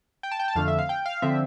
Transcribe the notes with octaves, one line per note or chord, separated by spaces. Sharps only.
G5
A5
G5
A5
F2 D3 A3 F5
E5
F5
G5
F5
D3 F3 C4 E5